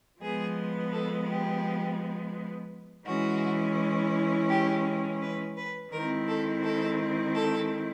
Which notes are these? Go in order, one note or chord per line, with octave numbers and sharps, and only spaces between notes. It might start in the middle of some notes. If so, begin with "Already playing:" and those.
F3 G#3 B3 G#4
A4
G4
E3 G#3 C#4 E4 F#4
G4
B4
B4
D#3 G#3 C4 E4 A#4
A4
A4
A4